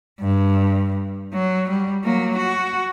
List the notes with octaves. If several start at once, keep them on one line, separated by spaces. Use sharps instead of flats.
G2
F#3
G3
F#3 A#3
F#4